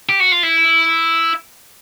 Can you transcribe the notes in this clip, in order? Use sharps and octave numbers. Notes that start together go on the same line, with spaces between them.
G4
F#4
F4
E4